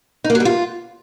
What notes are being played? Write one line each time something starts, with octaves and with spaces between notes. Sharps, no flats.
D#4
A#3
F#3
G3
F4